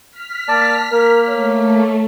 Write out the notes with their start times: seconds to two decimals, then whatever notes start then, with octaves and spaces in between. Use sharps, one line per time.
0.11 F6 B6
0.48 A#3 D5 A5
0.92 A#3 A#4
1.29 A3 C#5